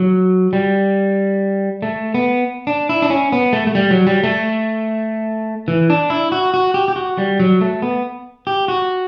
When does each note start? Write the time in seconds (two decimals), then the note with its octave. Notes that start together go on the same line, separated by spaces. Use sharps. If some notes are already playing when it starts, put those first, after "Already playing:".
Already playing: F#3
0.53 G3
1.82 A3
2.14 B3
2.67 D4
2.89 E4
3.02 D4
3.10 C#4
3.32 B3
3.53 A3
3.67 A3
3.75 G3
3.91 F#3
4.07 G3
4.24 A3
5.68 E3
5.90 D4
6.10 E4
6.32 F#4
6.54 F#4
6.74 G4
6.88 G4
6.96 F#4
7.18 G3
7.40 F#3
7.61 A3
7.82 B3
8.47 G4
8.68 F#4